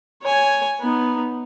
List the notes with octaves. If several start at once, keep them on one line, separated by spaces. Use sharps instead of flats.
C#5 G#5
B3 D#4